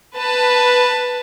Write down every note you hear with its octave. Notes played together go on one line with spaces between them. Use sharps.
B4 A5